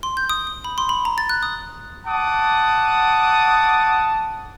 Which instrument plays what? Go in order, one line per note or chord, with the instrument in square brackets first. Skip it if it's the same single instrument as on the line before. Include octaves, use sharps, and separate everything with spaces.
[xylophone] C6
G6
D#6
D#6
B5
C6
B5
A#5
A6
F#6
D#6
[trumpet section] F#5 D6 D#6 [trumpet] A5